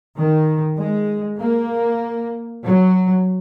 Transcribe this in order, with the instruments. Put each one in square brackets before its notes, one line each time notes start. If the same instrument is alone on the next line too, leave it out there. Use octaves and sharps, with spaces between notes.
[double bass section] D#3
G#3
A#3
F#3